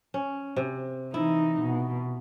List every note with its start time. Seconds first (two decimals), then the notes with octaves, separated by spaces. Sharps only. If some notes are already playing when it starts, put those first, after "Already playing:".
0.14 C#4
0.56 C3
1.14 E3 D#4 E4
1.62 B2